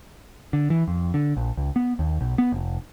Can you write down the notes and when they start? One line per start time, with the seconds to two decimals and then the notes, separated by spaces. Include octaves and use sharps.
0.53 D3
0.70 E3
0.88 F2
1.14 D3
1.37 A#1
1.57 C#2
1.76 B3
1.99 D#2
2.21 B1
2.38 B3
2.52 F1